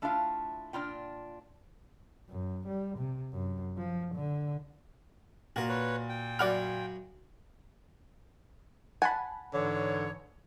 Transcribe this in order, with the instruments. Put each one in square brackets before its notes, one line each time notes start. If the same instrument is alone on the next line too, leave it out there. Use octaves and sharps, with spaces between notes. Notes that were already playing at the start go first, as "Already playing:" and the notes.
[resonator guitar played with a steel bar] A3 D4 E4 F4 F5
A#2 D4 E4 F4 G5
[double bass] F#2
G3
C3
F#2
F3
D3
[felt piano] A#2 [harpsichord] F#4 A#4
[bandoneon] B4 C#5
G5
[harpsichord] F#2 F#4 B5 [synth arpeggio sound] D5 F#5 F6
[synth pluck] F#5 A5 B5 [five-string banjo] G#5
[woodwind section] G#2 E3 C#5 [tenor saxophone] D3